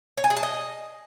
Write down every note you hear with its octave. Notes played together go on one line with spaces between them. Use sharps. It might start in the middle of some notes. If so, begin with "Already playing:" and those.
C#5
G#5
G#4
A5
D#5